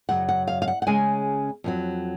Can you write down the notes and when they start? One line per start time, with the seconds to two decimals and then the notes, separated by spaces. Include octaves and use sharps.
0.09 F#2 C#3 F#3 F#5
0.29 F#5
0.48 F5
0.62 F5
0.68 F#5
0.82 F#5
0.87 C#3 G#3 C#4 G#5
1.64 F2 D#3 F#3